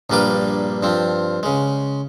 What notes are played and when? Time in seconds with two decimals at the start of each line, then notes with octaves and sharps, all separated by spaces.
0.10 A#1 G2 G3 A#3 B4 D6
0.83 G2 F3 C4
1.43 C#3 G#3